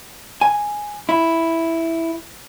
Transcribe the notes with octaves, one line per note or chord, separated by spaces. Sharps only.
G#5
E4